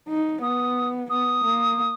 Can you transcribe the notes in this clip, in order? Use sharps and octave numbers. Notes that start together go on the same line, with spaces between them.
D#4
B3 D#6
B3 D#6
A#3